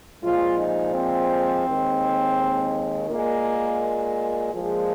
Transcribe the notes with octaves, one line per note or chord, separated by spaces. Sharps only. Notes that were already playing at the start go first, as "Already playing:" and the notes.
A#2 F3 G#3 F4
D#4
C4
D#2 D#3 G#3
A#2 G#3 A#3
A#2 F3 G#3 G#4